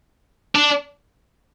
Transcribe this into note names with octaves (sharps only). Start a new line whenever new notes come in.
D4